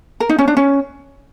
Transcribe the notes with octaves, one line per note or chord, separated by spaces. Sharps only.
A#4
D#4
C#4
D4
C#4